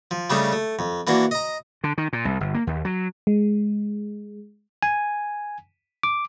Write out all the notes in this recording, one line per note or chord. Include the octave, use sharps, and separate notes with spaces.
F3
C#3 G3 A3 D4 D#4
A3
F2
E3 A#3 D4 F#4
D#5 A#5
D3
D#3
A#2
C2
G1
A#3
D#2
F#3
G#3
G#5
D6